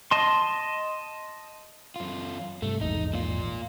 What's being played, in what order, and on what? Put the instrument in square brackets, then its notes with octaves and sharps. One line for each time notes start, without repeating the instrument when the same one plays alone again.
[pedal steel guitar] D#5 A5 C6
[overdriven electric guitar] F#2 F4
[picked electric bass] G2 C3 [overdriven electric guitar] A3
[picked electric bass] A#1 E2 G#2 [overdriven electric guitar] D#4
[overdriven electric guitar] A#2 F4